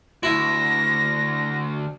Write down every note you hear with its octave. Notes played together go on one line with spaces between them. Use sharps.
D2 E4 A#6